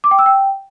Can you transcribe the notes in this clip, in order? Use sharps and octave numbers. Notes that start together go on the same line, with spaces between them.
D6
G5
E6
G5